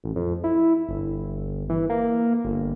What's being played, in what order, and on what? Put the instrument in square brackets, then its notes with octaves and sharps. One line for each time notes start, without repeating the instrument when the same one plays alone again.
[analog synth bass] A1
F2
E4
G1
E3
A#3
G1